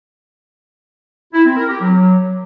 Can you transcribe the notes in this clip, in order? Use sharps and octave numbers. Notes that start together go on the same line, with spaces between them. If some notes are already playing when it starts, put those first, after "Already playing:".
E4
C4
A#4
G4
F#3